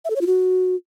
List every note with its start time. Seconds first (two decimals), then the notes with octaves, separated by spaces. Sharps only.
0.05 E5
0.10 A4
0.16 C#5
0.21 F4
0.27 F#4